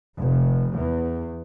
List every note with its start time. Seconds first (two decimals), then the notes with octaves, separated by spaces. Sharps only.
0.18 F1
0.74 E2